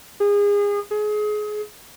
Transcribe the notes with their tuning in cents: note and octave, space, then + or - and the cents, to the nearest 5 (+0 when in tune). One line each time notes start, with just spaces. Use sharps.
G#4 -30
G#4 +25